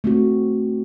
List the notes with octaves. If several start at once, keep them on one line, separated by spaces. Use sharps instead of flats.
A3 C4 F#4